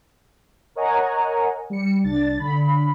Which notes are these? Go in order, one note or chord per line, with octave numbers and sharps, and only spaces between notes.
A#4 C#5 D#5 F#5 G#5 A#5
G3 C#7
C2 D4 A6
D3 B5